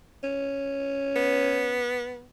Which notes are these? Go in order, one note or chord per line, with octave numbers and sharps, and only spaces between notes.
C#4
B3